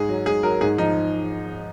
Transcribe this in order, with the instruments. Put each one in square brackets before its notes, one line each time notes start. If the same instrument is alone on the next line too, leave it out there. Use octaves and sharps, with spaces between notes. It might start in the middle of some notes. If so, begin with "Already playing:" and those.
Already playing: [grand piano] G#2 G#4
F#3
G#2 G#4
F#3 A#4
G#2 G#4
F3 D#4